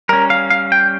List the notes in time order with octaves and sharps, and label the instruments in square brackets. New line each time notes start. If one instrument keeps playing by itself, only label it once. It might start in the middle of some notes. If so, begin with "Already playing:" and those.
[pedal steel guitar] G3 C#4 A#4
F5
F5
G5